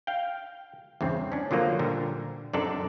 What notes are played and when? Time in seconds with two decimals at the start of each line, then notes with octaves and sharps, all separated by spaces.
0.07 F5 G5
1.01 E2 G2 C#3 C4
1.32 C#4 D4
1.51 D3 F3 F#3 A#3
1.79 A#2 D3 G3
2.53 F#2 C3 D4 D#4 A4 D5